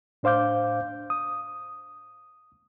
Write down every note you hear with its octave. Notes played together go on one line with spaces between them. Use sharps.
A2 D4 C5 F5 D6 G6
D#6